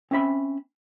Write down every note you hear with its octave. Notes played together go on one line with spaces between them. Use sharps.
C4 C#4 E5 B5